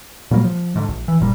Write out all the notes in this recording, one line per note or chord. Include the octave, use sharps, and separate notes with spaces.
A#2 F#3 G3 A#3
F3
G#2 D3
A#1
E3
F#1 A#2 G3